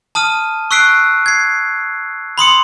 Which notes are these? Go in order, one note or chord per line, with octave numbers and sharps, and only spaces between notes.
A5 D#6 F6 D#7
C#6 E6 F#6 B6 C7 D7
G#6 C7
B5 C6 D#6 C#7